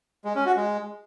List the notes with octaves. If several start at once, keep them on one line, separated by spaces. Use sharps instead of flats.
G#3
C#4
F#4
G#3